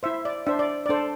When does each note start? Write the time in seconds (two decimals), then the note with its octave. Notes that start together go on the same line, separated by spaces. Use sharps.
0.03 E4 C5 E5
0.25 D5
0.47 D4 C5 E5
0.59 D5
0.86 D4 A4 C5 D5